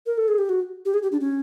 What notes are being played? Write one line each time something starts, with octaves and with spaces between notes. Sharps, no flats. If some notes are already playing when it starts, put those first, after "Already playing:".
A#4
A4
G#4
G4
F#4
G4
G#4
G4
D4
C#4